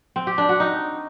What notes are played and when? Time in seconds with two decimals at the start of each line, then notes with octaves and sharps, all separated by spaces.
0.16 C4
0.27 G4
0.38 D4
0.49 F#4
0.60 D#4